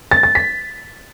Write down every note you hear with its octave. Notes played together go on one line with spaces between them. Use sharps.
A6
A6
B6